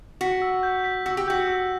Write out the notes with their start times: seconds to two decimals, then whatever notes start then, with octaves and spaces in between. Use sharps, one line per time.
0.21 F#4 B6
0.42 E6
0.63 G6
0.84 B6
1.06 F#4 E6
1.17 G4
1.28 F#4 G6
1.48 E6